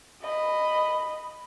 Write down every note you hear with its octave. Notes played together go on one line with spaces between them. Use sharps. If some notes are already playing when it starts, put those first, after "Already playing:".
D#5 B5